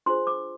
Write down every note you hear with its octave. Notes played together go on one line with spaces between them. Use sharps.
D4 F4 G#4 C5 C6
D6